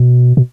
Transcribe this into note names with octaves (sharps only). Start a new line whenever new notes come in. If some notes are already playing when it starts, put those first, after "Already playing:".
Already playing: B2
B2